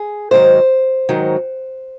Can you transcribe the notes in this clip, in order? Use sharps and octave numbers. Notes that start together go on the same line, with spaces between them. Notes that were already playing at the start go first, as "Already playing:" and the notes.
Already playing: G#4
G#2 D#3 F#3 C5
G#2 D#3 F#3